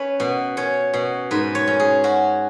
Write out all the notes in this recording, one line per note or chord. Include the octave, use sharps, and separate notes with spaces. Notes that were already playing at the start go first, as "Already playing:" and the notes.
Already playing: C#4 B4
B2
C#4 C#5
B2
G#2 B4
C#5
C#4
G#4
C#4 F#4